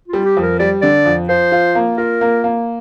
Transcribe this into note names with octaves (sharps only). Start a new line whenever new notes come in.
F4
G3
G4
F2
A#4
G3 D5
D3 D5
F2
F3 C5
F4
A#3
F4 A#4
A#3
A#3